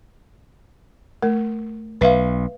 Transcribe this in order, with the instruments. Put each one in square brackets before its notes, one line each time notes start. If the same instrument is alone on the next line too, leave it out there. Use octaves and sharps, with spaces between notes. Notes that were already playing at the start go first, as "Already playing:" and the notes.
[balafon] A3 A#4
[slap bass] B1 [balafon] B4 E5 F5